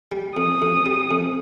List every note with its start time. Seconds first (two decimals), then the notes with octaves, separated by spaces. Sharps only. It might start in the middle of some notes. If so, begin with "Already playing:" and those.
0.12 G3
0.37 F2 D#6
0.62 F2
0.86 G3
1.11 F2